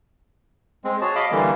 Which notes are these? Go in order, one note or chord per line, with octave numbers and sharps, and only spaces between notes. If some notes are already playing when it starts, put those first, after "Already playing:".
G#3 C4
F#4 G#4 C#5 A5
D#5 F5 B5 D6
D3 E3 G3 A#3